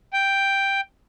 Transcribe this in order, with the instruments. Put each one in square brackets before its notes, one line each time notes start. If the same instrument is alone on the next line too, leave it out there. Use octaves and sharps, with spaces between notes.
[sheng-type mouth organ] G5